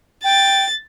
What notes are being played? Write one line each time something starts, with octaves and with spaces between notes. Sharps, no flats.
G5 A6